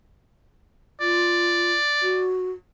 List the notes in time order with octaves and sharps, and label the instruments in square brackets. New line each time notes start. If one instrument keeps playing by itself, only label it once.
[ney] F4 [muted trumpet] D5
[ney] F#4